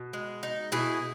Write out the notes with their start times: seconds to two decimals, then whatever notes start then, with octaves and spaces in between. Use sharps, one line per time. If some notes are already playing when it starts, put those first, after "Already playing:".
Already playing: B2
0.13 G#3
0.43 D#4
0.72 B2 E4 G#4